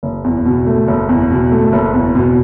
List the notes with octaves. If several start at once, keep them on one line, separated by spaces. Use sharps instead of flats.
F#1
E2
B2
A3
F#1
E2
B2
A3
F#1
E2
B2